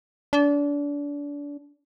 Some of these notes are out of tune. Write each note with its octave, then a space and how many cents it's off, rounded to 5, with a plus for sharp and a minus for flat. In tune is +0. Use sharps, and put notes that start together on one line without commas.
D4 -30